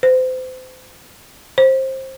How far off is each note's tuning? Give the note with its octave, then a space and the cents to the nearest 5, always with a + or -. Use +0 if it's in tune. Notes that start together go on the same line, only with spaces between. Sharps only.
C5 -30
C5 +20